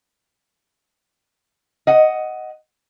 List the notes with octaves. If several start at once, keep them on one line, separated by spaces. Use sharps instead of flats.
D#5 F#5